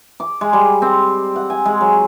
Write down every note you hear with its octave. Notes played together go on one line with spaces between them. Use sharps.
D6
G#3
G3
C4
F#5
G#5
G#3
F#3